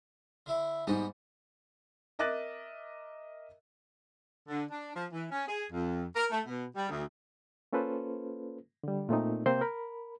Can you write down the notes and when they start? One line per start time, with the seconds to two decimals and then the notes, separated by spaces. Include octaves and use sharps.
0.46 D3 E4 E5
0.87 G#2 G3 B3 D#5 G5
2.19 A#4 D#5 E5 D6 F#6 A6
4.49 D3
4.70 D4
4.95 F3
5.12 E3
5.31 C#4
5.48 G#4
5.71 F2
6.16 A#4
6.32 A3
6.47 B2
6.76 G3
6.89 D2
7.73 A#3 C#4 F4 A4 B4 C5
8.83 D3 G3
9.09 A#2 A3 C4 D#4
9.46 C3 A#3 C4 C5 C6 G6
9.61 A#4 B5